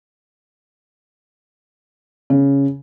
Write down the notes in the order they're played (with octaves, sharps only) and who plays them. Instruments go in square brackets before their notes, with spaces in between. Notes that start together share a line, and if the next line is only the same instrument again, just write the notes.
[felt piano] C#3